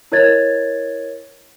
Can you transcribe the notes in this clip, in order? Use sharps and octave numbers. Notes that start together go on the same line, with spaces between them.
E4 A#4 C#5 D#5 G#6 A6